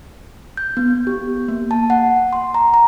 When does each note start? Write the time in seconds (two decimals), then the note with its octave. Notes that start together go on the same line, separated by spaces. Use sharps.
0.57 G6
0.77 B3
1.07 G4
1.48 A#3
1.71 A5
1.90 F#5
2.33 C6
2.54 A#5
2.74 A#5